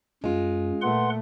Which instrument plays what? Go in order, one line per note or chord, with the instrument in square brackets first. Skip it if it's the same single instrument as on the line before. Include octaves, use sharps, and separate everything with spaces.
[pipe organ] F#2 [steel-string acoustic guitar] G#3 F4
[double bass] A#2 A3 [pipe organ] B4 F#5 C6